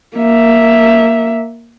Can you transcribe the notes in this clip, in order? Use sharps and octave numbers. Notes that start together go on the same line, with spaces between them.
A#3 E5